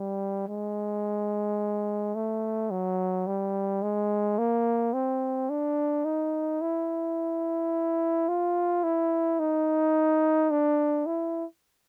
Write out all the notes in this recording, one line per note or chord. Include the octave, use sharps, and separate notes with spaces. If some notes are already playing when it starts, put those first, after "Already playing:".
Already playing: G3
G#3
A3
F#3
G3
G#3
A#3
C4
D4
D#4
E4
F4
E4
D#4
D4
E4